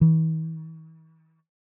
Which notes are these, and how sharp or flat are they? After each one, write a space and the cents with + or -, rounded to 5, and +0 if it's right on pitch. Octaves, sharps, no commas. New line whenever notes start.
E3 -45